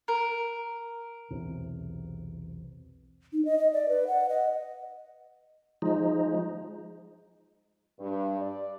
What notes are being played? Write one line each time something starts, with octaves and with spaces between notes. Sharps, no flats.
A#4
B1 E2 C3
D#4
D#5
D#5
D5
B4
F#5
D#5
F3 G#3 D#4
G2
D5